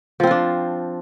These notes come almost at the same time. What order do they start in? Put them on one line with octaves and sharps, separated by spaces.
F3 C4 F4 D4